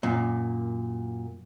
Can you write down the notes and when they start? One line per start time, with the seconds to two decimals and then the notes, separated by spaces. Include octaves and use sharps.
0.03 F#2 A#2